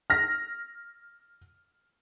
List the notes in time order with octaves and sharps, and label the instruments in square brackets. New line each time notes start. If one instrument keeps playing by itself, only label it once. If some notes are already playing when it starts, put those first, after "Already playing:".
[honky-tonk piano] F6 A#6